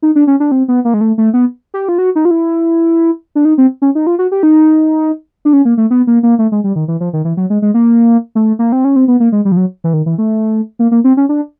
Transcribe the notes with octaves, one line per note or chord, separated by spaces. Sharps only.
D#4
D4
C#4
D4
C4
B3
A#3
G#3
A3
A3
B3
G4
F4
F#4
D#4
F4
E4
D4
D#4
C4
C#4
D#4
F4
F#4
G4
D#4
D4
C#4
A#3
A3
B3
A#3
A#3
A3
G#3
G3
D#3
E3
F3
D#3
E3
F#3
G#3
G#3
A#3
A3
A#3
C4
C#4
C4
B3
A#3
G#3
G3
F3
F#3
E3
D#3
E3
A3
A#3
A#3
C4
C#4
D4